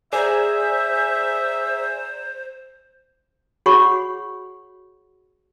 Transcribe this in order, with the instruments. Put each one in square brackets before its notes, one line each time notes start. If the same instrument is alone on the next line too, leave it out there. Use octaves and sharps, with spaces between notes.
[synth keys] G#4 [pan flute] C5 [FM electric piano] D5 A#5 [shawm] E5
[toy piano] F#4 G#4 C#5 F#5 B5 C#6